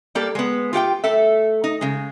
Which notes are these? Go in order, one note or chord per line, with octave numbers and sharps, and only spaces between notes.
G3 A#3 G4 A4 D5
G#3 B3
F4 G4 F#5 G5
A3 A4 E5
D#4
C#3 G#3